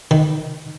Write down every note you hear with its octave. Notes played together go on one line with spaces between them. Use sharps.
D#3